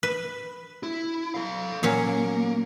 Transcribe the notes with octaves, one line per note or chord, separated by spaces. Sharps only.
B4
E4
A4 F5
A#2 F#3 A#3 C#4